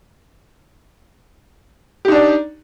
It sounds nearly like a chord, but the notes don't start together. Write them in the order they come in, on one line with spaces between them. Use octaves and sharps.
G4 D#4 D4 D5